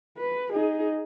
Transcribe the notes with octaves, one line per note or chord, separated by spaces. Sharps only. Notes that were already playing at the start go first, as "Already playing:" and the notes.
B4
D#4 G#4